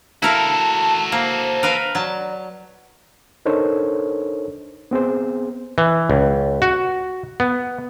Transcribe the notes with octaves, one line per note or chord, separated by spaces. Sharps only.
E4 F#4 A4 A#4 F5 A5
A#3 C5
A#4 B4 F5
F#3 D5 A5
D4 D#4 A4 A#4 C5 C#5
B3 C4 G#4 C5
E3
C#2
F#4
B3